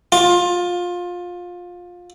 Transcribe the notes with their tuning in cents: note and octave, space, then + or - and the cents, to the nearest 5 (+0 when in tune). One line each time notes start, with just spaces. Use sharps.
F4 +20